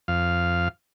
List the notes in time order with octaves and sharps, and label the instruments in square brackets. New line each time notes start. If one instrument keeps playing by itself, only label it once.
[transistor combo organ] F2 F5